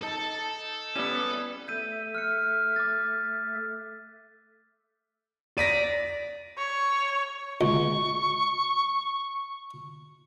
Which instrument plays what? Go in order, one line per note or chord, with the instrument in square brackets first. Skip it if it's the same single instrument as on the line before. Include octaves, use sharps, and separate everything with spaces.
[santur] D#4 [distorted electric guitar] A4 A5
[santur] G3 E4 [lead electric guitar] B3 C#4
[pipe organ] A3 A4 E5 [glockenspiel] G6 D#7
[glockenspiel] F6 F#6 C#7
D6 A6
[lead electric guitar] D5 [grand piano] A#6 B6 D#7
[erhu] C#5
[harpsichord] C#2 [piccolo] C#6